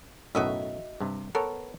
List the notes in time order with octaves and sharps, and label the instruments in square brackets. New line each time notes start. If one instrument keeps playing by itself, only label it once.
[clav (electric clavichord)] B1 F#2 A2 [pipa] F#4 D#5 E5
[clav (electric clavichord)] G2 C3
[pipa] B3 [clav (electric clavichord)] A4 A#4 C#5